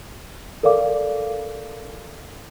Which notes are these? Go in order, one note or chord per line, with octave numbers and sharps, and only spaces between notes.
A4 A#4 D5 F5 D6